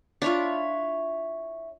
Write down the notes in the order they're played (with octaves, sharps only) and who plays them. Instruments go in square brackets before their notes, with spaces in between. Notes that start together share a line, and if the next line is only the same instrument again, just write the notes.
[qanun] D4 F4 [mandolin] E4 C#5